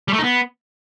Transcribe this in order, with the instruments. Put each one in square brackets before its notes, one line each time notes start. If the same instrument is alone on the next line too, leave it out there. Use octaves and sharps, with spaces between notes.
[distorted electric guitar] G3
A3
D#4
B3